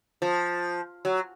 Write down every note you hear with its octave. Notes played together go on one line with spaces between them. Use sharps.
F3
F#3